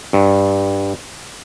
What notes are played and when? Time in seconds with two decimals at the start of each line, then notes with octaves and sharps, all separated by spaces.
0.13 G2